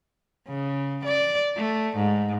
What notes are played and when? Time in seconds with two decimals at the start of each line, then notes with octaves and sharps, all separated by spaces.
0.48 C#3
1.05 D5
1.56 A3
1.96 G#2